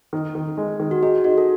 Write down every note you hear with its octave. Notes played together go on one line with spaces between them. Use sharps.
D#3
D#3
G#3
D#3
F#4
D#4 G#4
D#4 F#4
A4